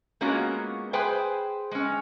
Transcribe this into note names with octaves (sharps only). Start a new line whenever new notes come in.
G#3 A#3 B3 C#4 F4 F#4
G#4 B4 C5 G5 G#5
G#3 C#4